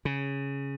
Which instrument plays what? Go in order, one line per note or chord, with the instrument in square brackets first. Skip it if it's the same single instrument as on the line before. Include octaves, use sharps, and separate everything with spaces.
[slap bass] C#3